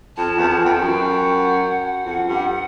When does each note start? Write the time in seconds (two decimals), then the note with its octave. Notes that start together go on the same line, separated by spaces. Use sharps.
0.17 F2 A5
0.38 E2
0.48 F2
0.64 E2 G5
0.72 F2
0.80 F#2
1.11 F#5
2.05 F2
2.28 G2